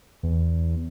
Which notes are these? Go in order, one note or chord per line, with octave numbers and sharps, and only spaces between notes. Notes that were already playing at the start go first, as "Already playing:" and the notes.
E2